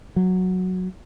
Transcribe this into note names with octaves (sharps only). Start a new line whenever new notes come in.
F#3